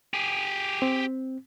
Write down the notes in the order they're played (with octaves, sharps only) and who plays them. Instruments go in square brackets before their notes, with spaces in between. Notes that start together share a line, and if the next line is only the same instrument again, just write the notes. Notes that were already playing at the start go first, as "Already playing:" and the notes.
[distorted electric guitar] G4 G#4
[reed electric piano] C4